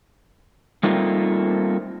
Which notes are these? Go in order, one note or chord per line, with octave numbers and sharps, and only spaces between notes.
G3 A3 A#3 C4 D#4 F4